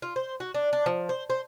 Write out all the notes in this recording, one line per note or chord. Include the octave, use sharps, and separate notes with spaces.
F4
C5
F#4
D4
D4
F3
C5
C5